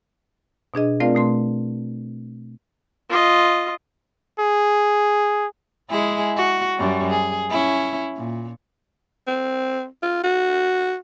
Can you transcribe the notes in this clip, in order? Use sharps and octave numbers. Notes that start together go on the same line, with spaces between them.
B2 D4 G#4 D#5
A3 C4 F4 A#4 D5 F5
B2 A3 C6
F4 D#5
G#4
G#3 E4 G#4
F#4
F#2 G3
G#4
C#4 E4
A#2
C4
F4
F#4